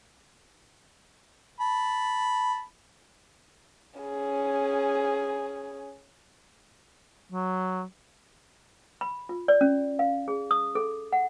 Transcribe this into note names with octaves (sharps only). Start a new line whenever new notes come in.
A5 B5
C#4 G#4
F#3
B5
F4
D5
C#4
F5
G#4
D#6
A4
F#5